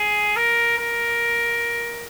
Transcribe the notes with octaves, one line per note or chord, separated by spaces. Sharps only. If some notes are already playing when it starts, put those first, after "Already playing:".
Already playing: G#4
A#4
A#4